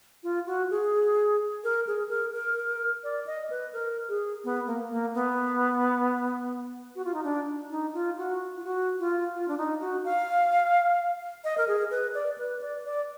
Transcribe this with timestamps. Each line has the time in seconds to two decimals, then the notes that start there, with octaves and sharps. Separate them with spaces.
0.23 F4
0.46 F#4
0.70 G#4
1.64 A#4
1.87 G#4
2.09 A#4
2.34 A#4
3.03 D5
3.26 D#5
3.50 B4
3.73 A#4
4.08 G#4
4.44 B3
4.67 A#3
4.90 A#3
5.14 B3
6.96 F#4
7.04 F4
7.14 D#4
7.23 D4
7.70 D#4
7.94 F4
8.18 F#4
8.57 F4
8.64 F#4
8.99 F4
9.34 F4
9.48 D4
9.58 D#4
9.81 F#4
10.04 F5
11.44 D#5
11.58 A#4
11.67 G#4
11.91 B4
12.14 D5
12.38 B4
12.61 D5
12.85 D5